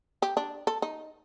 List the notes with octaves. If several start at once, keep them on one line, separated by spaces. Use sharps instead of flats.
G4
D4
A4
D#4